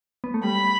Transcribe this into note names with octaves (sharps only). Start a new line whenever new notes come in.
B3
A3
G3 B5